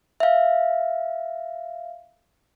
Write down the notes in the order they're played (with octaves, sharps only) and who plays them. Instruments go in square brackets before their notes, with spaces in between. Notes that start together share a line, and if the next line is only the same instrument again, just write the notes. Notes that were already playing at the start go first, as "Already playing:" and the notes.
[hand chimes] E5 F5